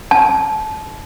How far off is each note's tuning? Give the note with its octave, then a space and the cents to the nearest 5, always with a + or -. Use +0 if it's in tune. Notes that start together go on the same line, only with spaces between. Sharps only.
A5 -25